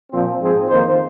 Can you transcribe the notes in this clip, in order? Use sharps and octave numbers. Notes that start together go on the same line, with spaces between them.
A#2 F3 C4
G#2 F3 C4 G#4
F2 D#3 A#3 D#4 C5